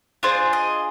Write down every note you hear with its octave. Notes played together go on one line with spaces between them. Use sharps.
D4 F4 G#4 C5
D#5